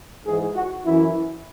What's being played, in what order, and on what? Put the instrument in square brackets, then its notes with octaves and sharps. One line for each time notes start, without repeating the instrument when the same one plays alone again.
[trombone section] G#2 E3 G#4
F#4
F#2 E3 E4